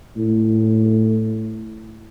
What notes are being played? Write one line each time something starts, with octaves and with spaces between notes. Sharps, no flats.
A2